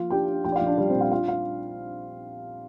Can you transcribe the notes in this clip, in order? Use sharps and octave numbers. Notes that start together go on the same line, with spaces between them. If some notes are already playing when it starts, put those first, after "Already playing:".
Already playing: F3 A#3 F4 F5
D4 G4 G5
D4
A#1 G4 G5
D5
F4 F5
A#1
D4 D5
G3 G4
C4 C5
A#2
F4 F5
D4 F4 F5
D4 F4 F5